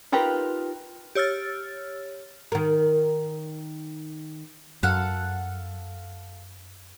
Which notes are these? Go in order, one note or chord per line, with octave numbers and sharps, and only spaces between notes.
D#4 F4 G4 A#4 B4
G4 C#5 E6 F6 A6
D#3 A#4
F#2 A4 F5 F#5